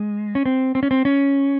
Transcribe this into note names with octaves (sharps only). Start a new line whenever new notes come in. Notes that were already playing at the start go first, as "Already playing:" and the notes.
Already playing: G#3
C#4
C4
C4
C#4
C4
C#4